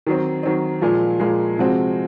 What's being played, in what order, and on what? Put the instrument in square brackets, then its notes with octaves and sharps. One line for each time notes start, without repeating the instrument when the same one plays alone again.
[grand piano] D#3 F#3 C4
D#3 F#3 C4
A#2 F3 G#3
A#2 F3 G#3
C3 F3 G#3 C4 F#4